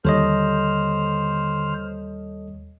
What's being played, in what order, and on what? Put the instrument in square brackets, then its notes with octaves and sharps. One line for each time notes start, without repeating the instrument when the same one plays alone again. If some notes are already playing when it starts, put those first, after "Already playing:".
[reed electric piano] D#2 G3 [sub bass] D3 [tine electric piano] A4 C#5 D#5 [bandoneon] C5 F6